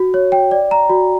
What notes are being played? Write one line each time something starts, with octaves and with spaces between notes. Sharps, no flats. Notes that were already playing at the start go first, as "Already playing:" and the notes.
Already playing: F#4
C#5
G5
D5
A#5
F#4